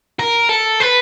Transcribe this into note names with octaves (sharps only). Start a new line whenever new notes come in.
A#4
A4
B4